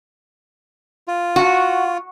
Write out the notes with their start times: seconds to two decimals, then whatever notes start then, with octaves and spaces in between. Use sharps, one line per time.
1.08 F4
1.36 F#4